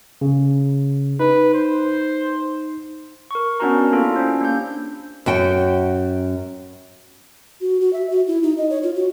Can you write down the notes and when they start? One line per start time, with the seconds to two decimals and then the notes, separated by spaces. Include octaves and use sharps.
0.21 C#3
1.19 D#4 B4
1.54 C5
3.31 A#4 C#6
3.60 B3 C#4 D4 F#4 A#4 A#5
3.92 A#3 D4 E4 F4 A4
4.16 C#4 D4 C5
4.41 A#3 G4 G6
5.26 F#2 F#4 G5
7.61 F#4
7.81 F#4
7.93 E5
8.10 F#4
8.27 E4
8.43 D#4
8.58 D#5
8.70 C#5
8.83 F4
8.96 F#4